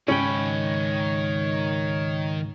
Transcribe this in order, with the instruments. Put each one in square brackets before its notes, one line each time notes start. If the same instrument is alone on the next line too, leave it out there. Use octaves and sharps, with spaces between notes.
[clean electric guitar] C#2 G#2 G5 [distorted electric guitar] D#3 B5 [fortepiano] C#4 [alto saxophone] C#5